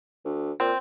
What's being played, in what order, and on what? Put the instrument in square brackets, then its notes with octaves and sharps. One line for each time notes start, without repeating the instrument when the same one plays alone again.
[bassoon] D2
[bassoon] A#2 [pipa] C4